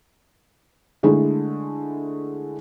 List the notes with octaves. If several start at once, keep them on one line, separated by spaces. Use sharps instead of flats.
D3 G#3 A3 E4